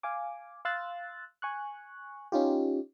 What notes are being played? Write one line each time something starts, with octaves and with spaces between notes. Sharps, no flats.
F5 G#5 D6
F5 C6 E6 F#6 A6
G#5 C#6 F#6
C#4 D#4 F4 G4